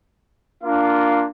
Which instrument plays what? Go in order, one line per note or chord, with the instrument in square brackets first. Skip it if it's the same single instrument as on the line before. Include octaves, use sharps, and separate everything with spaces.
[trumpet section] A#3 F4 [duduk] D4